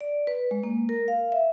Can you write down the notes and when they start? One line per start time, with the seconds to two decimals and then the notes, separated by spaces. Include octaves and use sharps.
0.01 D5
0.27 B4
0.51 G#3
0.63 A#3
0.89 A#4
1.08 F5
1.32 E5